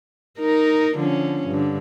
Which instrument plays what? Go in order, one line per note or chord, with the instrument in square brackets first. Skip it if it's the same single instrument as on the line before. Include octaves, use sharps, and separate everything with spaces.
[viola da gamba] D#4 A#4
D3 F3 C#4
G2 D3